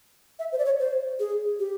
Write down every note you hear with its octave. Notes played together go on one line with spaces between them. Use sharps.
E5
C5
D5
C#5
C5
G#4
G4